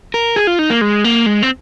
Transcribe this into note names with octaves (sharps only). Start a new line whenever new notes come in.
A#4
G#4
F4
D#4
A#3
G#3
A#3
G#3
C4